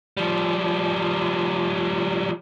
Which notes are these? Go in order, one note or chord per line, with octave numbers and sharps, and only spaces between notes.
F3 G3